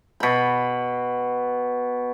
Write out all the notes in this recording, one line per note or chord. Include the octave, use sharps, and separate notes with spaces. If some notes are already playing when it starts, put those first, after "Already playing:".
B2 B5